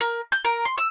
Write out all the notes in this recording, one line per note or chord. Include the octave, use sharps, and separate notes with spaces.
A#4
G6
A#4
C6
E6